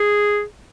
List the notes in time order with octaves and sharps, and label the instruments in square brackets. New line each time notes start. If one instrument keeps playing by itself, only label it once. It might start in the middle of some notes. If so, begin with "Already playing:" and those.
Already playing: [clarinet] G#4